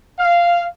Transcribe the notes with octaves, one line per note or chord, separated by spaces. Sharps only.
F5